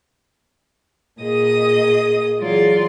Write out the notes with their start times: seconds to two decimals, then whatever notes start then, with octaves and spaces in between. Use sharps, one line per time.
1.19 A#2 G#4 D#5 D#6
2.39 E3 F#3 F4 G#4 D5 C6